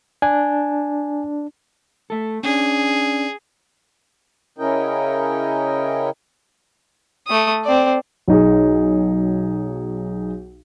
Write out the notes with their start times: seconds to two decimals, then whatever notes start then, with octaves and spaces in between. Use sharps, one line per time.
0.22 D4 G#5
2.10 A3 A4
2.43 C#4 D4 G#4
4.58 C#3 C#4 E4 A#4 D#5 G5
7.27 A3 D#6
7.64 C4 D5
8.28 B1 D#4 G#4